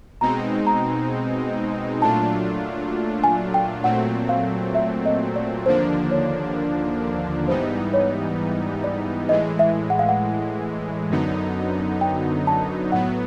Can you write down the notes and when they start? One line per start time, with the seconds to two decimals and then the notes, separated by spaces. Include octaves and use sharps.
0.21 B2 G#3 C4 D#4 A#5
0.67 A#5
2.02 A#2 F#3 A3 D4 F4 A5
3.24 G#5
3.54 G5
3.84 A#2 F#3 A3 C4 F#5
4.29 F5
4.75 E5
5.06 D#5
5.36 D5
5.66 D#2 D3 F3 A#3 D4 C5
6.11 C#5
7.48 G#2 E3 G3 B3 D#4 C5
7.93 C#5
8.84 D5
9.29 A2 E3 G#3 D#5
9.59 E5
9.90 F#5
9.99 F5
10.09 F#5
11.10 F#2 D3 F#3 B3 D#4
12.01 G5
12.47 A5
12.92 A2 F#3 B3 F#5